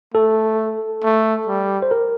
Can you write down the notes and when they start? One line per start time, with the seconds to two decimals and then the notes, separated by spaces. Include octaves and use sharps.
0.14 A3 A4
1.03 A3
1.47 G3
1.82 C5
1.91 A#4